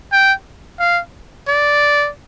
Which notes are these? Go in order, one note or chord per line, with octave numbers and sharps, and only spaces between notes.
G5
F5
D5